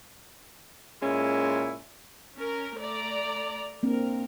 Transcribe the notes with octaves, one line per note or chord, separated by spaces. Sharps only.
A#2 G#3 C#4 E4
C#4 A#4
A3 D5 A#5
A#3 C4 D4 A#4